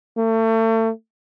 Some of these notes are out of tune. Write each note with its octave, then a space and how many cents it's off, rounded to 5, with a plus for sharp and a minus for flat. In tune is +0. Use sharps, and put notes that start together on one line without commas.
A3 +35